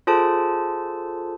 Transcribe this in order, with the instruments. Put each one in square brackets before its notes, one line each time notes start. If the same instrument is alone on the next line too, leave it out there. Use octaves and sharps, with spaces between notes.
[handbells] F4 G#4 A4 C5 A5